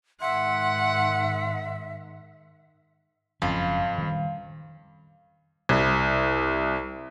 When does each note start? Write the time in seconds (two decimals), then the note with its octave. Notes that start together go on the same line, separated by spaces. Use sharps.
0.21 G#2 D#3 E5 F#5 C6
3.42 F#1 F2 G#2 C#4 F4 B5
3.98 D#3 G3
5.69 C2